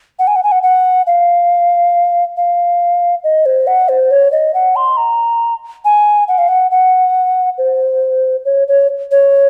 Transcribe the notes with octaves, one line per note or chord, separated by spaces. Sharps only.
F#5
G#5
F#5
G#5
F#5
F#5
F5
F5
D#5
C5
F#5
C5
C#5
D#5
F#5
C6
A#5
G#5
F#5
F5
F#5
F#5
C5
C#5
C#5
C#5